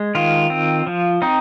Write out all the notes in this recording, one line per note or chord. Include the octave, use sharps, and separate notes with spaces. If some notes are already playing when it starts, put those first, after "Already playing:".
Already playing: G#3
D#3 F4
C4
F3
C4 D#4